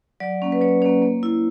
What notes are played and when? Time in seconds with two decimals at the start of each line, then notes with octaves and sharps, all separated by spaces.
0.20 F#3 D5
0.42 A#3 C#4
0.52 B4
0.61 F#3 C#5
0.82 A#3 C#4 C#5
1.02 A#3
1.23 E4